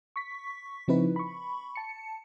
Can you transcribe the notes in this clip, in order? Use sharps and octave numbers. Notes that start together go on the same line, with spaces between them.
C#6 B6
C#3 F3 C4 D#4 E4 B4
B5 C#6
A5 C#7